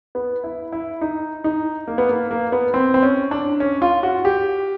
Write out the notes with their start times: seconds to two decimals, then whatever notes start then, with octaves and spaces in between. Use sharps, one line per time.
0.15 B3
0.44 E4
0.72 E4
1.01 D#4
1.44 D#4
1.88 A#3
1.98 B3
2.09 A#3
2.31 A#3
2.52 B3
2.74 C4
2.94 C4
3.02 C#4
3.31 D4
3.60 C#4
3.82 F4
4.03 F#4
4.25 G4